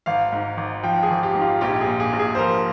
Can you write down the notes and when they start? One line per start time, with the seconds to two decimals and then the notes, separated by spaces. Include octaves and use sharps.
0.06 G#1 F5
0.32 G#2
0.57 G#1
0.83 F3 G5
1.03 G#4
1.10 G#1
1.23 G4
1.35 G#2
1.42 F4
1.61 A#1 G4
1.81 G#4
1.87 A#2
2.00 G#4
2.13 A#1
2.19 G#4
2.35 C5
2.39 F3 A#4